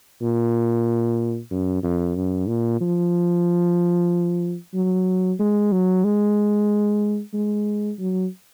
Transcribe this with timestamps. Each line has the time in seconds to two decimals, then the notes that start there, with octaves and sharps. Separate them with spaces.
0.22 A#2
1.51 F#2
1.83 F2
2.16 F#2
2.48 A#2
2.81 F3
4.74 F#3
5.40 G#3
5.72 F#3
6.04 G#3
7.34 G#3
7.99 F#3